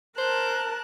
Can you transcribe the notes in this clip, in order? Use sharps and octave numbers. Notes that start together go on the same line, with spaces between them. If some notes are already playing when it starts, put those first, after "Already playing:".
A#4 C5 A5 F#6